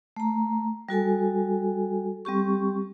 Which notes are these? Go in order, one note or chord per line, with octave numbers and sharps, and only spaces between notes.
A3 A#5
G3 F#4 A4 G#5
G3 C4 G4 C#6